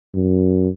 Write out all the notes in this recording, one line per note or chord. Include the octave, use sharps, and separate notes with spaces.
F#2